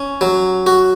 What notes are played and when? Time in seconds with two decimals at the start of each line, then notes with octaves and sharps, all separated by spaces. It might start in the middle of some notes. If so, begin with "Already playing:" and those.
Already playing: C#4
0.21 F#3
0.66 F#4